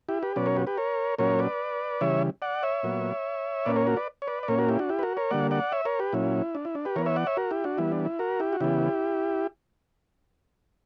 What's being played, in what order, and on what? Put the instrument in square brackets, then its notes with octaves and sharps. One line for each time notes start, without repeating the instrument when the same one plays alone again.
[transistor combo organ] E4 G4
G4 B4
B2 F#3 C#4 B4 D5
A#4 C#5
G4 B4
G4 B4
A#4 C#5
A#2 F#3 C#4 A#4 C#5
B4 D5
C#3 E3 G3 C#5 E5
D5 F#5
C#5 E5
A#2 F#3 B3
A#2 A#3 C#4 B4 D5
A#4 C#5
F#4 A#4
B4 D5
C#5
B4 D5
D5
A#2 A#3 C#4 A#4 C#5
F#4 A#4
E4 G4
D4 F#4
E4 G4
B4
F#4 A#4
A#4 C#5
D3 G3 A#3 D5 F#5
D5 F#5
C#5 E5
A#4 C#5
G4 B4
A#2 F#3 C#4 E4
D4
E4
D4
G4 B4
E3 B3 A#4 C#5
C#5 E5
D5 F#5
C#5 E5
F#4 A#4
E4 G4
D4 F#4
E3 G3 B3 E4
D4
E4
F#4 A#4
E4 G4
F#4
C#3 E3 B3 E4 G4